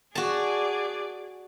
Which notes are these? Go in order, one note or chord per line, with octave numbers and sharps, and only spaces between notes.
F#4 G#4 D5 A5